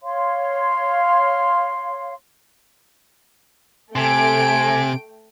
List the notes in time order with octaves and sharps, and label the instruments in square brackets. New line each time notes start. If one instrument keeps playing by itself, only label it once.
[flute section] C#5 F5 C6
[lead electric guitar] C3 [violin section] A3 G5 D7 [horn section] G#5